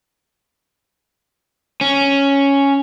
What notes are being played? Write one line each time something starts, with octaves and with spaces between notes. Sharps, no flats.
C#4